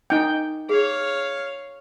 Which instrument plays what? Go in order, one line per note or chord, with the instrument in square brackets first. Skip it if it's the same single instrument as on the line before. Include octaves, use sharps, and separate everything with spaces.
[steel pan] D#4 G5 [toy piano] G#5
[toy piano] G#4 [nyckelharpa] C#5 F5